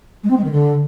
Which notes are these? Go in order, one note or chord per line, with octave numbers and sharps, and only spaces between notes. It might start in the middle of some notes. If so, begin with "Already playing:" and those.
G#3
C4
G#3
D#3
D3